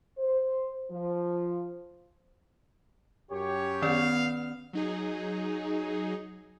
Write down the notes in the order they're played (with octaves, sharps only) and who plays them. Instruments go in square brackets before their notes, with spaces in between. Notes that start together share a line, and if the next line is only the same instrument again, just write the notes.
[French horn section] C5
F3
[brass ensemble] F#2 G4 C#5
[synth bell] D#3 C#4 D5 [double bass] B3 [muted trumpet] F5
[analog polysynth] F#3 D#4 G#4